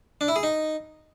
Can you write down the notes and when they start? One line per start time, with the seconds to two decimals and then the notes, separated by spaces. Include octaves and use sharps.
0.21 D4
0.28 E4
0.36 G#4
0.43 D#4